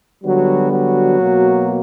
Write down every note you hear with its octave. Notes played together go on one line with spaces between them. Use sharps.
D3 F#3 G3 B3 F#4
F#3 F#4
B2 A#3